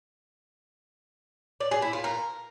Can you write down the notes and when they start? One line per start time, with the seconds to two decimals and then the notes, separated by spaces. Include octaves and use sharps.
1.60 D5
1.71 G#4
1.82 E4
1.93 F4
2.04 A#4